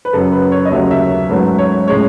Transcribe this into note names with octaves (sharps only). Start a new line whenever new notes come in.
B4
F#2 C#3 F#3 A4
B4
C#5
D#5
D#2 C#3 F#3 A3 C#4 E5
E5
G#2 F#3 A3 C#4 B4
C#5
A2 G#3 C#4 C#5